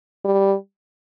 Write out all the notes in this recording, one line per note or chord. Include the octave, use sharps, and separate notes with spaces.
G3